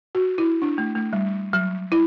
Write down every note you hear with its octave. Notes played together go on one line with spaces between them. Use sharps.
F#4
E4
D4
A3
A3
G3
F#3
E4